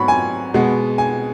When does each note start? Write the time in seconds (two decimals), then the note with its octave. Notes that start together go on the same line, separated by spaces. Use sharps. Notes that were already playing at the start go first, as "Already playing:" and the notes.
Already playing: G#2 F#3 B3 B5 C#6
0.08 G#5
0.54 B2 G#3 B3
0.98 G#5